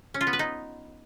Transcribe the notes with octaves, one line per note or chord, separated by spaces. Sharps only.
C#4
F4
B3
B4
D#4